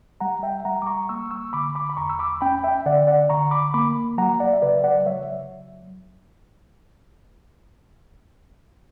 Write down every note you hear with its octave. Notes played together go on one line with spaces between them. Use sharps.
G3 F#5 A#5
E5 G5
G3 F#5 A#5
D6
A#5 C#6
A#3 C#6 E6
C#6 E6
D3 B5 D6
B5 D6
B5
E2 A#5 C#6
E6
B5 D6
C#4 G5 B5
E5 G5
D3 D5 F#5
D5 F#5
D3 A#5 C#6
B5 D6
A#3 B5 D6
F#3 F#5 A#5
D5 F#5
E5
C#3 B4 D5
D5 F#5
F#3 C#5 E5